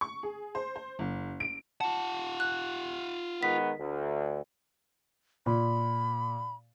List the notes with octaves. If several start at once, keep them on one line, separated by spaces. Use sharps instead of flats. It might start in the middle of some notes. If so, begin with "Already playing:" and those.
C#6
G#4
C5
C5
F#1
D7
F4 F#5 A5
F#6
D#3 G#3 B3 B6
D2
A#2 B5